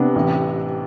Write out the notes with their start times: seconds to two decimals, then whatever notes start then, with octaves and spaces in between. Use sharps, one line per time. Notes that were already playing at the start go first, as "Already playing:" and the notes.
Already playing: C3 B3 D4
0.15 A1